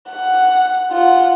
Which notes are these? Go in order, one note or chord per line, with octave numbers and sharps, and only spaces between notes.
F#5
F4 F#5